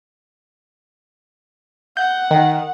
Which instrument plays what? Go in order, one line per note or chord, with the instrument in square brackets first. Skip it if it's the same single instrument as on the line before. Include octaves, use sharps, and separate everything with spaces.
[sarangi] F#5 [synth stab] G6
[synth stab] D#3